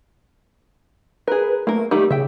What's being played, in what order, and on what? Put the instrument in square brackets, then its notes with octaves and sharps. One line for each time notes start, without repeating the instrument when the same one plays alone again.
[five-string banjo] G#4 A#4 [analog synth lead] B4
[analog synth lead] A3 [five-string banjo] A#3 A#4
[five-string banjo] D#3 G3 A3 [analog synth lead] G4
[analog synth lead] C#3 [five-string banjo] E5 G5